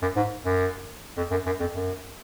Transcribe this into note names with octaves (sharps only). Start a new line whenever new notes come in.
F#2
G#2
F#2
F2
F#2
F#2
F2
F#2